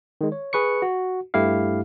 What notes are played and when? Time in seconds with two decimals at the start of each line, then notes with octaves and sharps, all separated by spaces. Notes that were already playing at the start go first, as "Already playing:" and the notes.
0.21 D#3 G#3
0.32 C#5
0.53 G#4 B4 C#6 C#7
0.82 F#4
1.34 G2 A3 E4 G4 F5